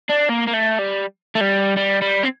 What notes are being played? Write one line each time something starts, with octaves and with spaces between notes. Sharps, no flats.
D4
A#3
A#3
A3
G3
A3
G3
G3
G3
C4